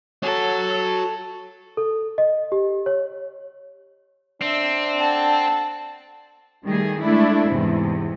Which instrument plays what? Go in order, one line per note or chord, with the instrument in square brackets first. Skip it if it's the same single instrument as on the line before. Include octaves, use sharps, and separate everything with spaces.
[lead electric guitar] F#4 C#5 [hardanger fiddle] A4
[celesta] A4
D#5
G4
C#5
[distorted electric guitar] C4 [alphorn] D4 [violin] E5
[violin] A4 F#5 [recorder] A5
[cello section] D#3 G3 A3 G#4
G#3 A3 D4 E4
E2 G#2 C3